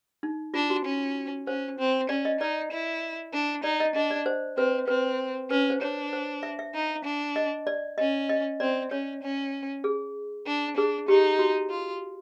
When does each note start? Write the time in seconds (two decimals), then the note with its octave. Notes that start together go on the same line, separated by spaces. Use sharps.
0.23 D#4
0.54 D4 F4
0.70 F#4
0.85 C#4
1.47 C#4 C5
1.79 C4
2.09 C#4 D5
2.25 D#5
2.40 D#4 D5
2.71 E4
3.33 D4
3.64 D#4 D5
3.80 D#5
3.96 D4 D#5
4.11 D5
4.26 C5
4.57 C4 B4
4.88 C4 B4
5.50 C#4 B4
5.70 C5
5.81 D4 C#5
6.13 C5
6.43 E5
6.59 E5
6.74 D#4
7.05 D4
7.36 D#5
7.67 D5
7.98 C#4 D#5
8.29 D#5
8.60 C4 D5
8.91 C#4 C#5
9.23 C#4
9.84 G#4
10.47 D4
10.77 D4 G#4
11.08 D#4 G4
11.39 F#4
11.70 F4